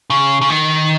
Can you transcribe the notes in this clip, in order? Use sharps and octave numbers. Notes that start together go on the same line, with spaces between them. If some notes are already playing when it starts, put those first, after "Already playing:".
C#3
C#3
D#3